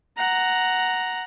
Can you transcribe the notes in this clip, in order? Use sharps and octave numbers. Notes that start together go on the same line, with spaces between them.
F#5 A#5